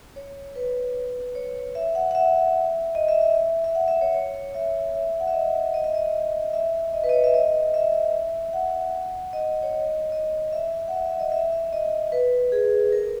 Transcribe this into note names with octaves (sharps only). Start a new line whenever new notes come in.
C#5
B4
C#5
E5
F#5
F#5
E5
D#5
E5
E5
E5
E5
F#5
E5
C#5
C#5
E5
E5
F#5
E5
D#5
D#5
E5
D#5
E5
D#5
B4
D#5
C#5
E5
D#5
E5
F#5
D#5
C#5
D#5
D#5
E5
F#5
E5
E5
D#5
E5
E5
D#5
B4
G#4
A#4